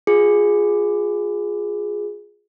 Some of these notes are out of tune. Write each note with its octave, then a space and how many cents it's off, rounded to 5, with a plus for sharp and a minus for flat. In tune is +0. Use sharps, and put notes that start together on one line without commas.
F4 +20 G#4 +0